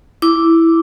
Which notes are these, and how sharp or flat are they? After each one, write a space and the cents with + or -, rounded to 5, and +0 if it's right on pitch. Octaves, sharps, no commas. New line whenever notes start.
E4 +0 D6 -5